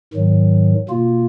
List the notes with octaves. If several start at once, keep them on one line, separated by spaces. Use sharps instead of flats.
G#2 D#3 F#3
B2 A#3 F4